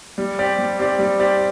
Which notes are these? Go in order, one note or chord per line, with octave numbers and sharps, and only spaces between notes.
G3
C4 G4 D5
G3
C4 G4 D5
G3
C4 G4 D5